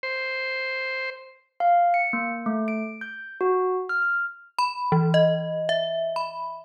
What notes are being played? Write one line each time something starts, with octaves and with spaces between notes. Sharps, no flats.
C5
F5
C#7
A#3
A3
D7
G6
F#4
F6
F6
B5
E3
D#5
E5
B5